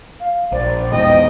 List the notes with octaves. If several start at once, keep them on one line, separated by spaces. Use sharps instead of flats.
F5
A#1 C5 D5
E2 G#2 B2 D#5 G5